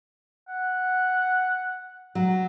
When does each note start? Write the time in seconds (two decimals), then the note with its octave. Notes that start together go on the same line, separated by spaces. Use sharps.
0.48 F#5
2.15 F#3